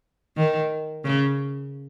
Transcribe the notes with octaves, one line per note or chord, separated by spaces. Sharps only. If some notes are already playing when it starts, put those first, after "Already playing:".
D#3
C#3